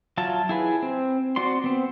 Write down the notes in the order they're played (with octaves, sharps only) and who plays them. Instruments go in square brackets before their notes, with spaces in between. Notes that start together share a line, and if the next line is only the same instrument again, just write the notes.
[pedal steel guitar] F#3 F4 E5 A5
E4 G#4 B4
C4
C4 F#4 D5 C6
B3 C4